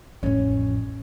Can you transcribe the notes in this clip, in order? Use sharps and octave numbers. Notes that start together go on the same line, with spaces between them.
A1 F2 C#4